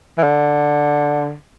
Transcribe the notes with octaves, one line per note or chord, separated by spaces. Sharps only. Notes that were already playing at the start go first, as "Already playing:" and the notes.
E3
D3